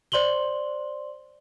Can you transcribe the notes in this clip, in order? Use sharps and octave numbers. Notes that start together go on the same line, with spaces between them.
C5 D5 C6 F#7 G7